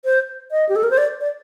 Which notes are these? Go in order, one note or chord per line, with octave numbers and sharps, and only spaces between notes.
C5
D#5
G4
A4
A#4
C5
D5
D5